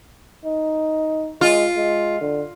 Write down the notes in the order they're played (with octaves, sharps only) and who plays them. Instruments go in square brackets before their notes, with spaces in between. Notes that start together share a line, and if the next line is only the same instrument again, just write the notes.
[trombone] D#4
[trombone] G#3 [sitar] F4
[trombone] G#3
D3